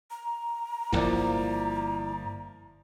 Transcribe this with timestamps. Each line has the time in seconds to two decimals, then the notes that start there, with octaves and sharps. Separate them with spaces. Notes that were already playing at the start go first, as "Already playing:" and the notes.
0.10 A#5
0.93 D1 G1 F3 A#3 E4 D5